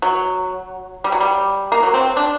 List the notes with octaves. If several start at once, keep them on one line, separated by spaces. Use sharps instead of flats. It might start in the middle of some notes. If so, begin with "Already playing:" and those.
F#3
G3
F#3
G3
A#3
F#3
C4
D4